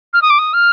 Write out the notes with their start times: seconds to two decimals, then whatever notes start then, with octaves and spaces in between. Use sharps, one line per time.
0.14 F6
0.22 D#6
0.30 D6
0.39 D#6
0.54 F6